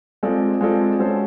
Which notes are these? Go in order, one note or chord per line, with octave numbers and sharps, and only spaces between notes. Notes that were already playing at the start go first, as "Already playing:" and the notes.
G#3 C4 F4 A4 D5
G#3 C4 F4 A4 D5
G#3 C#4 F#4 A4 C5